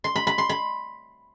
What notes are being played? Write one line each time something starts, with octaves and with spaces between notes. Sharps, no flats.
C6
B5
B5
C6
B5